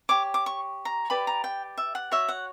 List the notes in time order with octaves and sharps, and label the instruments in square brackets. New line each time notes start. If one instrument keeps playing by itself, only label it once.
[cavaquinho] G4 C#5 D6
D6
C#6
A#5
G4 B4 D5 B5
A#5
G5
E5
F#5
F#4 C#5 E5
F#5